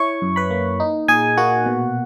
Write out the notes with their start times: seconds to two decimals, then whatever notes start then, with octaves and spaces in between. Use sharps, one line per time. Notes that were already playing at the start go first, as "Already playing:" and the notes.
Already playing: E4 C#5 C#6
0.22 F#2
0.36 B4 B5
0.50 A#3
0.80 D#4
1.08 A#2 G#4 G#5
1.37 A#3 F#4 F#5
1.66 B2